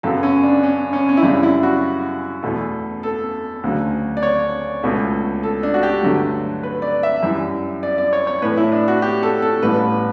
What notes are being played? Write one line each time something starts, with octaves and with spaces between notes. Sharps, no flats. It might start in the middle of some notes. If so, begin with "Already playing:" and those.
F#2 C#3 F#3 B3 A4
C#4
D4
C#4
C#4
C#4
E4
F#2 C#3 E3 G3 D4
E4
F#4
E2 B2 A3
A4
D2 C#3 F#3
D5
C#5
C#2 B2 A3
A4
D4
F#4
G4
G2 D3 F#3 A3
B4
D5
E5
F#2 E3 G3
D5
D5
C#5
C#5
A2 E3 A3 B4
E4
D4
F#4
G4
A4
A4
A1 A2 G3 B3 B4